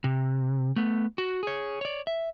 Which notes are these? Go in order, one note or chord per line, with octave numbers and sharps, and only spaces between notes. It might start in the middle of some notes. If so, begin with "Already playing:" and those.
C3
A3 B3
F#4
G#4 C#5
C#5 D5
E5